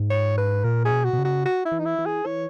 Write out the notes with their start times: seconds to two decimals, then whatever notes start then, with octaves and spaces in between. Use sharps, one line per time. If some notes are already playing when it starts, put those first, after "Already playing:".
Already playing: G#2
0.10 C#5
0.37 B4
0.64 A#2 A#4
0.85 G#4
0.91 B2
1.04 F#4
1.13 B2
1.18 C#3
1.24 F#4
1.45 F#4
1.65 E4
1.72 E3
1.79 D#4
1.85 E4
1.99 E3
2.06 G#4
2.25 E3 C#5